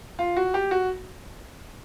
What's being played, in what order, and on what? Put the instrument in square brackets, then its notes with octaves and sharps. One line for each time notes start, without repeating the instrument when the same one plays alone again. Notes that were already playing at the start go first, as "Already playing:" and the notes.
[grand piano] F4
F#4
G4
F#4